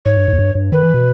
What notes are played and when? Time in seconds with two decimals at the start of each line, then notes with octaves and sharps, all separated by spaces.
0.05 G#2 C#5
0.16 G2
0.28 G#2
0.33 E2
0.39 G2
0.55 G2
0.72 D#3 B4
0.83 E3
0.94 B2